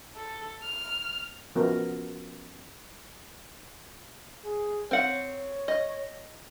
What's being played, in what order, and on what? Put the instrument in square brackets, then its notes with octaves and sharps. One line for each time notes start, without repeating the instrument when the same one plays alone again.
[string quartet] A4
F6
[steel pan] F3 B3 C#4 F#4 A#4
[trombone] G#4
[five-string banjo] C4 F#5 [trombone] C#5
[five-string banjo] D#5